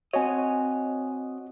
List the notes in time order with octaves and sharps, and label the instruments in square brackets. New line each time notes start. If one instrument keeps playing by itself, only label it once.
[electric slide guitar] C4 D#5 [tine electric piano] F#4 [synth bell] C#5 G#5